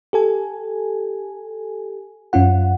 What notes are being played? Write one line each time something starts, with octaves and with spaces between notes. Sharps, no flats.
G4 A4 G#5
F#2 C#4 F4 F#5